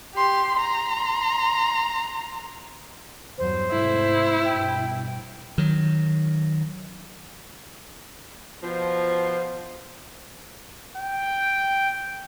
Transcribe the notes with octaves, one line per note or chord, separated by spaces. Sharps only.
G4 C6
A#5 C6
E2 G2 F#3 C5
G#2 C3 A3 E4
G2 B2 G5
D#3 F#3
B2 F3
G5